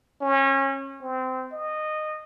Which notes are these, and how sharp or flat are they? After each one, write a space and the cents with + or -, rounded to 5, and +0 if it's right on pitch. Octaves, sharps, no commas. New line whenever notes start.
C#4 -30
C4 -20
D#5 -15